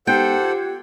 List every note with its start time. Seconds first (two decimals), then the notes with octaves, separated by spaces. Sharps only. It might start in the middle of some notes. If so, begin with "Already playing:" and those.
0.07 G#3 B3 D#4 G4 A4 C5 F#5 G5
0.43 F4 F#6 G#6